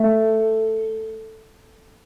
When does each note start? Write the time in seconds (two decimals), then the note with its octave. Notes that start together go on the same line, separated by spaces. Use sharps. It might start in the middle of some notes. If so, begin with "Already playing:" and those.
Already playing: A3